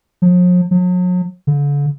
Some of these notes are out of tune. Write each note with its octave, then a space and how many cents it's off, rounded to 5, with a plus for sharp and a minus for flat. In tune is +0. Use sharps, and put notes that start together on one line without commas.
F3 +45
F#3 -40
D3 -40